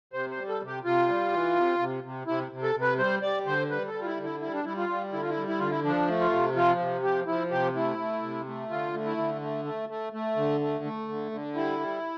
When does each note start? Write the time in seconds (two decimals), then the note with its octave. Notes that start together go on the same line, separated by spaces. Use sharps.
0.13 C3 C5
0.31 C5
0.36 G3
0.49 A4
0.61 C3
0.67 G4
0.84 C3 F4
1.08 G3
1.32 E3
1.55 C3
1.79 C3
2.04 C3
2.27 C3 E4
2.51 C3
2.63 A4
2.75 C3
2.81 B4
2.98 G3 C5
3.22 G3 D5
3.46 D3 C5
3.70 G3 B4
3.88 A4
3.94 G3
4.02 F4
4.06 E4
4.17 D3
4.23 E4
4.41 G3 E4
4.53 D4
4.65 G3 E4
4.77 F4
4.89 G3
5.13 D3 E4
5.21 F4
5.29 E4
5.37 G3
5.48 E4
5.59 D3 F4
5.71 E4
5.84 F3 D4
6.08 A3
6.20 F4
6.32 C3
6.55 F3 F4
6.79 C3
7.03 F3 G4
7.27 F3 E4
7.51 C3 G4
7.75 A3 E4
7.99 A3
8.22 C3
8.46 A3
8.70 D3 F4
8.94 A3
9.05 E4
9.17 D3
9.41 A3
9.65 A3
9.89 A3
10.13 A3
10.36 D3
10.61 A3
10.84 A3
11.08 D3
11.31 D3
11.55 G3 E4
11.80 G3